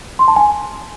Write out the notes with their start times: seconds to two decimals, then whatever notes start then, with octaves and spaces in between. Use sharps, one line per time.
0.19 C6
0.28 A5
0.36 G#5